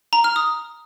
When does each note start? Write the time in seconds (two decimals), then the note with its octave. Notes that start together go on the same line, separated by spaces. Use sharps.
0.13 A#5
0.24 F6
0.36 D#6